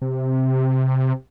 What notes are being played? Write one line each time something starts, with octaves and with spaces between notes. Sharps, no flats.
C3